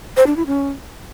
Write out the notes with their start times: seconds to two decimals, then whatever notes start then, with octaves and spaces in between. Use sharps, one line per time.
0.17 C5
0.27 D4
0.37 E4
0.47 C#4